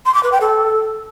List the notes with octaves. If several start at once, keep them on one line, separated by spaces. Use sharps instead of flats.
C6
D6
B4
G5
A4